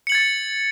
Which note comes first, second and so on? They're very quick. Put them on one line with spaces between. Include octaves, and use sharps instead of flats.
C#7 F#7 G#6 A6